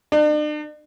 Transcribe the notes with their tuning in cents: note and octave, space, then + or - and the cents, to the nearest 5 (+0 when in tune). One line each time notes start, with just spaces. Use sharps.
D4 +45